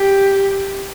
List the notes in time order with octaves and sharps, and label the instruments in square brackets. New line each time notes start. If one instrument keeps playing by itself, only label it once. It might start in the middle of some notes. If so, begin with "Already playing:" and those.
Already playing: [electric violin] G4